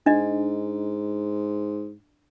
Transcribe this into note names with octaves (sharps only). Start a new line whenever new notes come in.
G#2 D4 D#5